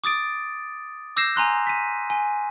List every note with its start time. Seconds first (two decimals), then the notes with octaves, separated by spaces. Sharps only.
0.04 D6 D#6 A6 D7
1.17 D6 E6 G6 A#6 C7 E7
1.36 G#5 A#5 C6 F#6
1.67 B6 D#7
2.10 G#5